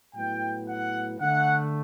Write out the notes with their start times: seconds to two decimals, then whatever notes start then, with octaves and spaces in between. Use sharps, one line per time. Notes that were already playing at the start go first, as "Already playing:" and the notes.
0.15 A2 F#3 B3 G5
0.67 F#5
1.20 D3 A3 F#5